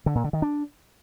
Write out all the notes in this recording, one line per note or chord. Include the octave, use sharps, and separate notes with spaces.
D3
A#2
D3
D#3
D4